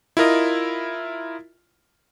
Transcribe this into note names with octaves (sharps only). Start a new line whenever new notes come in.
E4 F4 A#4 D#5